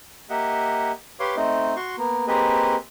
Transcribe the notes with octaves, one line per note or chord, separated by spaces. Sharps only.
A#3 G4 D#5 E5 F#5
G4 B4 C#5 F5 C6 D6
A3 C4 D#4 D#5
F#4 C6 C#6
A#3 B3
A#3 C4 G4 G#4 B4 D#5